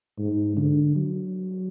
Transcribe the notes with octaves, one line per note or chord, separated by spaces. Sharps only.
G#2
D3
F#3